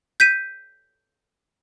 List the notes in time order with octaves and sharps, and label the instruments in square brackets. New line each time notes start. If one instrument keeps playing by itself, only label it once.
[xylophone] G6 B6 D#7